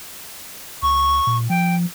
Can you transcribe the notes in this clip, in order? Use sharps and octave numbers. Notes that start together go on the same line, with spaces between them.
C#2 C#6
A#2
F3 G5